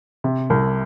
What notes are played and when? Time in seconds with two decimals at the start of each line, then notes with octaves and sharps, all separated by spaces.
0.24 C3
0.50 C2